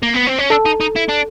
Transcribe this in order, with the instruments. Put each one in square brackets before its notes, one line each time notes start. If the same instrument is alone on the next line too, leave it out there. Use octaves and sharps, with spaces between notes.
[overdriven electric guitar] A#3
B3
C4
C#4
[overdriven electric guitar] D4 [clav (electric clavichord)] A4
[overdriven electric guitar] D#4
D#4
E4
D4